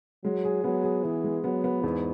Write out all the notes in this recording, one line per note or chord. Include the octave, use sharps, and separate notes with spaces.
F#3 G#3
G#4
F#3 B3
G#4
E3 G#4
G#3
F#3 B3
B3
E2 G#2